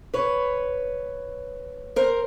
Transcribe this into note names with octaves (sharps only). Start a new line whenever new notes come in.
B4 C#5
A#4 C5